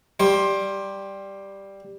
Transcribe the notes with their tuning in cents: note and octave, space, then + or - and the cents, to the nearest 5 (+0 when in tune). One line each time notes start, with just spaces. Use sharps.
G3 +0 C5 +20